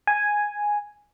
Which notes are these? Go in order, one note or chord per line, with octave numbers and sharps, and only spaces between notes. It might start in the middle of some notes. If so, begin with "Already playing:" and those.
G#5